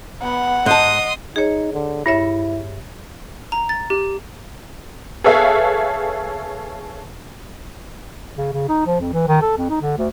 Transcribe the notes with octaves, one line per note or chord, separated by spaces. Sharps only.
B3 F#5
G#2 D#5 A5 C6 D#6
D#4 G#4 C#5
D3
G2 E4 C#5 E5
A#5
A6
G4
G#4 A4 B4 C#5 E5 F5
C#3
C#3
D#4
F3
F2
E3
D#3
A4
F2
D#4
D3
D2